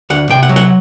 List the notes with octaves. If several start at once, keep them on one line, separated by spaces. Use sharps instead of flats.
D2 F#5
C3 G5
F#5
F#3
F#5